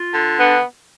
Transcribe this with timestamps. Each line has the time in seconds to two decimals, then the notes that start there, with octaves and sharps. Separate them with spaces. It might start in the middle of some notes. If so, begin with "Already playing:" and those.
Already playing: F4
0.13 D3
0.39 B3 D4